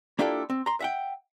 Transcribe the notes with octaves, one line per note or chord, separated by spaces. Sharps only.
A#3 D4 E4 F4 G4 A4
C4
A#5 C6
E5 F#5 G5